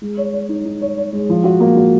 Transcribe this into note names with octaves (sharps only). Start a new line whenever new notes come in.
G#3
C#5
C#5
D#4
D#4
C#5
C#5
G#3
F3
F#4
A#3
F#4